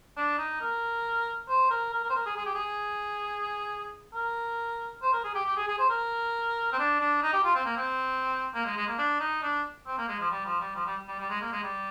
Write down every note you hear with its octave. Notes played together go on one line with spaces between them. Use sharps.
D4
D#4
A#4
C5
A#4
A#4
A#4
C5
A#4
G#4
G#4
G4
G#4
A#4
C5
A#4
G#4
G4
G4
G#4
G#4
C5
A#4
C4
D4
D4
D#4
G4
F4
C4
A#3
C4
A#3
G#3
G#3
A#3
D4
D#4
D4
C4
A#3
G#3
F3
G3
F3
G3
F3
G3
G3
G3
G#3
A#3
G#3
G3